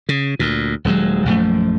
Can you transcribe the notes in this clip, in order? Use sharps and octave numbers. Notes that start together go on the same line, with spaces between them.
C#3
D2 A#2
D#1 D#2 F#3 G#3
A#1 F#2 F3 A3